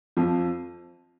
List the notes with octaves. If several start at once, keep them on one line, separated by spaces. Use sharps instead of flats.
F2 F3